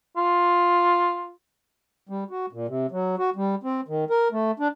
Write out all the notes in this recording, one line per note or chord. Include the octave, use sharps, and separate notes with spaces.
F4
G3
F#4
A#2
C3
F#3
F#4
G3
C4
D#3
A#4
A3
D4